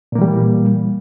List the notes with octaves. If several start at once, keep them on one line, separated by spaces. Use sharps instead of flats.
A#2 E3 G3 A#3